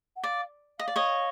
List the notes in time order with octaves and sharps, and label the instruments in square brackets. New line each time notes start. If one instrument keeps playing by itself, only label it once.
[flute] F#5
[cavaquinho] D5 [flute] F5
[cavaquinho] D#5 [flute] F5
[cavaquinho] D5
C#5 D#5